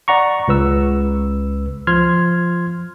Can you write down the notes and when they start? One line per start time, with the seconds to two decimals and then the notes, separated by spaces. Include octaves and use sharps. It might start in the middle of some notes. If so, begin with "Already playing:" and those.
0.08 D5 F#5 A#5 C#6
0.48 C#2 B4 E6
1.87 F3 C6 F6 G#6